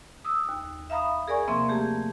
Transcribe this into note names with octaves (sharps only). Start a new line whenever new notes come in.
D#6 E6
D#2
E5 F5 A#5 B5 D#6
G#4 A#4 D5 G#5 C#6
C3 F3 A#3 C4 E5 C6
A3 G4 G#4 A5 A#5